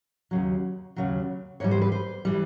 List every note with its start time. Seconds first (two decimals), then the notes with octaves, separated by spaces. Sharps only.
0.31 D#2 C#3 F#3
0.96 D#2 C#3 F#3
1.60 G#2 E3 G3 C#5
1.71 C5
1.82 B4
1.92 C5
2.25 E3 G3